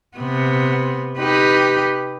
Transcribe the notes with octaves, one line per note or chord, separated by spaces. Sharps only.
C3 B3
D#4 G4 B4